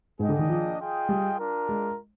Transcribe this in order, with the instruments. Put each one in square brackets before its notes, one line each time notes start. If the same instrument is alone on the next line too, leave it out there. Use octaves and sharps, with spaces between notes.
[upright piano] G#2 [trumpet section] A#3 D4 G#4 D#5 G5
[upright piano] D3
D#3
F3
[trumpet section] F4 G#4 D#5 G5
[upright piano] G3
[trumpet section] D4 F4 A#4
[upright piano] G#3